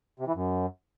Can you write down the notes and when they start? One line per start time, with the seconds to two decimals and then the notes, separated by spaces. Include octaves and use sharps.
0.20 C3
0.27 E3
0.35 F#2